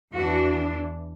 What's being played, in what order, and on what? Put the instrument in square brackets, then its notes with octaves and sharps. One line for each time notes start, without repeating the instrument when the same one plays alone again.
[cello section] E2 E3 D4 F#4